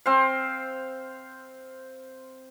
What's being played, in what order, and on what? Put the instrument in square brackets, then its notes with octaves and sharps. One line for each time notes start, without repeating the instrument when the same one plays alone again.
[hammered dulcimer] C4 C5 F5